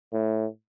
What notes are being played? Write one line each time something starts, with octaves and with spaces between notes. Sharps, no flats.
A2